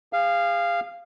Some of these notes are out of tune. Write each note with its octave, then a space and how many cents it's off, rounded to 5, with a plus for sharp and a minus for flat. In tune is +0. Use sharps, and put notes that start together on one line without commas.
G#4 -40 F5 -10